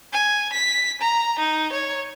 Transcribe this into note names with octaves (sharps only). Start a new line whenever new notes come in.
G#5
B6
A#5
D#4
C#5